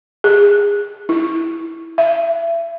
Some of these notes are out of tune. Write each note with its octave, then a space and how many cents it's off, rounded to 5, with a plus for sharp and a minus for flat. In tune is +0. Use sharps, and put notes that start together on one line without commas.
G#4 -25
E4 -5
E5 +30